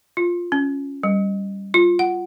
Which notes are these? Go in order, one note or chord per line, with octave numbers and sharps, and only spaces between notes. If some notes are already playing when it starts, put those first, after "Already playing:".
F4
C#4
G3
F4
F#5